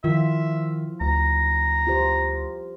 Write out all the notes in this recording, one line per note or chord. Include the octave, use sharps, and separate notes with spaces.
D#3 F3 E4 F4 E5
D2 A#5
F4 G4 C5